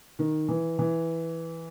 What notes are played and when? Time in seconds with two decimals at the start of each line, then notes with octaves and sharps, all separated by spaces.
0.19 D#3
0.48 E3
0.79 E3